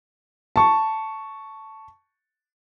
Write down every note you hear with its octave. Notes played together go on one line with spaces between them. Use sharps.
A5 C#6